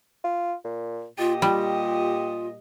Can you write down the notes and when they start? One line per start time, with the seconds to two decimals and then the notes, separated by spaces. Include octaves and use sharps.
0.24 F4
0.65 A#2
1.19 A#2 F4 G4 D#5
1.42 G3 F4